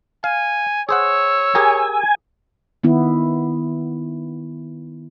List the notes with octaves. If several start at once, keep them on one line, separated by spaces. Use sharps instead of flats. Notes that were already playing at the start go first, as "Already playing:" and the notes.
F5 G#5
G#4 C5 C#5 F#5 E6
G4 G#4 A#4 G#5
D#3 B3 E4